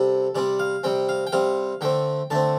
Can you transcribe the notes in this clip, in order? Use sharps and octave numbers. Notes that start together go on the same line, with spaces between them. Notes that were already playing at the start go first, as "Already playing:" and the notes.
Already playing: C3 G3 A4
C3 G3 C4 D5
F5
C3 G3 C4 G5
F5
G5
C3 G3 C4 F5
D3 A3 C4 G5
D3 A3 C4 A5